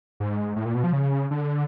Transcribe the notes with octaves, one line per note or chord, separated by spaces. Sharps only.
G#2
A2
A#2
B2
F3
C#3
D3